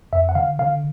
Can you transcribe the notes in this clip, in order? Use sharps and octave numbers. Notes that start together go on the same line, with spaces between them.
F2 E5
F#5
D3 F5
D3 F5